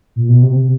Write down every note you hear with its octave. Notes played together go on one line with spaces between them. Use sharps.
A#2
B2
C3
C3